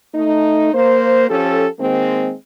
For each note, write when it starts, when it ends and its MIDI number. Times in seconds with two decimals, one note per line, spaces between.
0.15 0.71 57
0.15 0.71 63
0.73 1.28 58
0.73 1.28 72
1.29 1.67 53
1.29 1.67 61
1.29 1.67 67
1.29 1.67 69
1.79 2.32 51
1.79 2.32 56
1.79 2.32 58
1.79 2.32 60